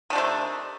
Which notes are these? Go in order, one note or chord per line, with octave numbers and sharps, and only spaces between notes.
C3 D#3 A3 D4